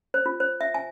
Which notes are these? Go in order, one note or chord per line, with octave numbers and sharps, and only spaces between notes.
C5
F4
C5
E5
G#5